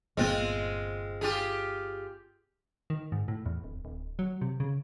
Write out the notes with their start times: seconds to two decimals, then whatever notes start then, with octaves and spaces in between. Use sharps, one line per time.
0.17 G1 A#2 G#3 B3 C4 F4
1.21 F4 G4 G#4
2.90 D#3
3.12 G#2
3.28 A2
3.46 E2
3.64 D1
3.85 D1
4.19 F#3
4.41 C3
4.60 C#3